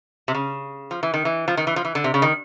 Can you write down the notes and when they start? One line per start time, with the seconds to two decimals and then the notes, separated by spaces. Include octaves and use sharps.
0.28 C3
0.35 C#3
0.91 F3
1.03 E3
1.14 D#3
1.25 E3
1.48 F3
1.57 D#3
1.67 E3
1.76 F3
1.85 E3
1.95 D3
2.04 C3
2.14 C#3
2.22 D#3